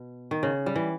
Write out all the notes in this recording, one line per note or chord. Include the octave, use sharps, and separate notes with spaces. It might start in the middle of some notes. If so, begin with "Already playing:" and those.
Already playing: B2
D#3
C#3
G3
E3